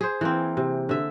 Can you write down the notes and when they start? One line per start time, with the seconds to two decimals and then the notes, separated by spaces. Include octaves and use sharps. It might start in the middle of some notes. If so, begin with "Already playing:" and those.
0.01 G#4 C5
0.21 E3 A#3 C4
0.57 C3
0.89 D3 E5